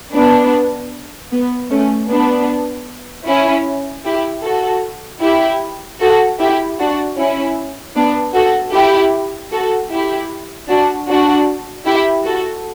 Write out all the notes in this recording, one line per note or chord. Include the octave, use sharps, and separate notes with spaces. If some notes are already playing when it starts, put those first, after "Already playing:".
B3 D4
B3
A3 C#4
B3 D4
C#4 E4
E4 G4
F#4 A4
E4 G4
F#4 A4
E4 G4
D4 F#4
C#4 E4
B3 D4
F#4 A4
E4 G4
F#4 A4
E4 G4
D4 F#4
D4 F#4
E4 G4
F#4 A4